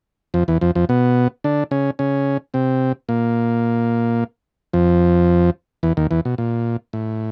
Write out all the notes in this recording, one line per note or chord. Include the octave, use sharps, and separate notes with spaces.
F2 F3
E2 E3
F2 F3
F2 F3
B2 B3
D3 D4
C#3 C#4
C#3 C#4
C3 C4
A#2 A#3
F2 F3
E2 E3
D#2 D#3
E2 E3
B2
A#2
A2